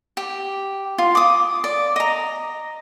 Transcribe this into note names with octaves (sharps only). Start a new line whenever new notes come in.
G4
F4
D6 D#6
D5
D#5 A#5